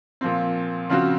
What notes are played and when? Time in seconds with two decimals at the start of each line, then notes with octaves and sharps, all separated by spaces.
0.21 A#2 F3 C4
0.89 C#3 F3 C4 F#4